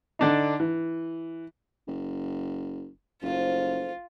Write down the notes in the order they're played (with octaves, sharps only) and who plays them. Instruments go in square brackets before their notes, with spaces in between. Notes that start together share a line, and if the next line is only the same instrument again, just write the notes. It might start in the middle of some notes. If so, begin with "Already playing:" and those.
[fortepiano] D3 D4 D#4
E3
[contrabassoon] F#1
[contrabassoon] F#1 [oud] F3 A3 [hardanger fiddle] F4